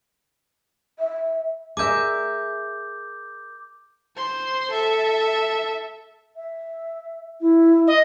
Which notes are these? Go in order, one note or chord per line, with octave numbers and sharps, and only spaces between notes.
E5
G#4 A#4 E5 D6 G6
C5 C6
A4 E5
E5
E4
D#5